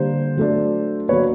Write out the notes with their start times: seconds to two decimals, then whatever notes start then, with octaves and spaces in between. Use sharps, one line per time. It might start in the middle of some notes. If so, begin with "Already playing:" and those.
Already playing: D3 G3 A#3 D4 C5
0.37 F#3 A3 D4
1.09 F#3 A#3 D4 B4 C#5